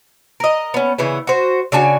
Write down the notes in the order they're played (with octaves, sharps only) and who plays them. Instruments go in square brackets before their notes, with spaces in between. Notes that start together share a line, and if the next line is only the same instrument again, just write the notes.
[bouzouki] A#4 D#5
B3 C#4
C#3 E3 B3
F#4 C5
C#3 D4 F#4 G#5